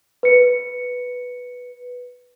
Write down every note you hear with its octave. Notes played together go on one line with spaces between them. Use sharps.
B4 C#7